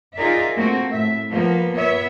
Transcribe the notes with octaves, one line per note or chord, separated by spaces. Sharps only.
D#4 F4 G#4 A#4 D5 E5
A3 A#3 C4 F#4
A2 E5
F3 A#3 B3
B3 C#5 E5